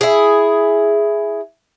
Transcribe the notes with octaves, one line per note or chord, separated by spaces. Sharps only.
E4 G#4